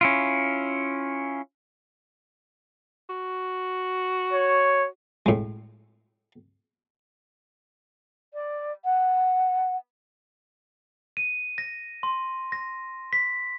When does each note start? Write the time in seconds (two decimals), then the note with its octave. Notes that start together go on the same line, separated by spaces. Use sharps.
0.01 C#4 E4 F4
3.09 F#4
4.33 C#5
5.26 A2 G#3
8.33 D5
8.84 F#5
11.17 D#7
11.58 A#6
12.03 C6
12.52 A#6
13.13 B6